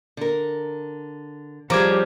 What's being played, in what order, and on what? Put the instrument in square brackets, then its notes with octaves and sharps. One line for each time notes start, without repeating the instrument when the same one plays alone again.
[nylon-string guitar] D3 A#4
[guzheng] F3 [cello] G3 G4 [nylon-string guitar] C#4 G#4 [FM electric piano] A#5 D6 G#6